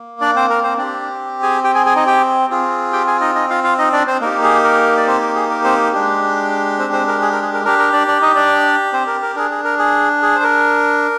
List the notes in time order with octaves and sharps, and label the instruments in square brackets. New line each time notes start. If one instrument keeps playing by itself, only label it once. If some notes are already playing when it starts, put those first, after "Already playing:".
Already playing: [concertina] A#3
D4 D5
C4 C5
A#4
C4 C5
C4 D4 G4 D5
G#4 G#5
G4 G5
G#4 G#5
G#4 G#5
D#4 D#5
G4 G5
C4 F4 G#4
G4 G5
G#4 G#5
D#4 D#5
D#4 D#5
F4 F5
F4 F5
D#4 D#5
D4 D5
C4 C5
A#3 D#4 G4 A#4
G#4
A#4
D5
C4 C5
A#4
G#4
A#4
C4 C5
G#3 D4 G4
C4 C5
C4 C5
A#4
G#4
A#4
G#4
A#4
D4 G4 A#4
A#4
D4 D5
D4 D5
D#4 D#5
D4 D5
C4 C5
A#4
A#4
D4 G#4 A#4
G#4
A#4
G#4
G#4
C5
A#4